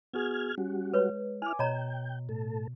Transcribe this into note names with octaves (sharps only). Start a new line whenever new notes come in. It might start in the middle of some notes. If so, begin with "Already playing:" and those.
B3 F#4 G#4 F6 G#6
G3 C#4 F#4
G#3 B4 C#5
E4 G#5 D6 F6
B2 C#5 D#5 G5 A#5
A2 A4